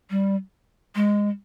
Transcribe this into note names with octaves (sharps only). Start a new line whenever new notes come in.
G3
G#3